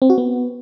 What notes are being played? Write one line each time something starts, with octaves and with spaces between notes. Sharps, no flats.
C4
F#4
B3